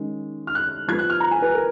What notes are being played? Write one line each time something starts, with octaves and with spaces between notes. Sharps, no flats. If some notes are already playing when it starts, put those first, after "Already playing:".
Already playing: D#3 G#3 C#4
F6
F#6
F3 B3 G#6
F#6
F6
A#5
G#5
B4
A#4